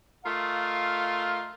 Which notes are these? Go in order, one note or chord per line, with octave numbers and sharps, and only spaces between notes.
A3 F4 A#4 D#5 F5